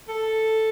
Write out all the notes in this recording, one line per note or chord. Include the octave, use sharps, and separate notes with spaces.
A4